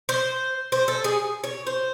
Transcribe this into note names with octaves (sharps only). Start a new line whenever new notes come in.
C5
C5
A4
G#4
C#5
C5